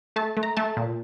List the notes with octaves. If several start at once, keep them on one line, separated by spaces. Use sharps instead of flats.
A3 A5
A3
A#5
A3 A5
A#2